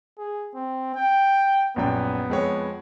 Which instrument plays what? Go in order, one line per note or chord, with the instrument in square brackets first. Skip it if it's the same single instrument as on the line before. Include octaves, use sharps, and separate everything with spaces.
[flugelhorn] G#4
C4
G5
[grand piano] A#1 F#2 G5 [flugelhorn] B3
[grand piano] F2 G#3 C#5